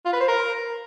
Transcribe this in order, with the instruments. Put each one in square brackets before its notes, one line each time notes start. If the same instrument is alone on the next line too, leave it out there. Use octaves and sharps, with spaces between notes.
[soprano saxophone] F4
B4
C5
A#4